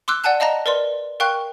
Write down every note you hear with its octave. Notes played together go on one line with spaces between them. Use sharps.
C6 D6 E6 F#6
D5 F#5 G#5 A5 F#6
D#5 F5 A5 A#5 A#6
A#4 B4 D5 C6
A#4 F5 G5 C#6 F#6